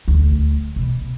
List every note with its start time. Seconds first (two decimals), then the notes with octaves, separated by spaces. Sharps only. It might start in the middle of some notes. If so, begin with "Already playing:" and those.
0.08 D2
0.76 B2